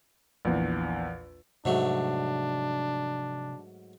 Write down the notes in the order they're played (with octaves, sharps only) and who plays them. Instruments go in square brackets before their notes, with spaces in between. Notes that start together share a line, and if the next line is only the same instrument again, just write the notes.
[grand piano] A#1 E2
[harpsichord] G#2 F#3 A3 [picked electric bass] C3 F3 [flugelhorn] D4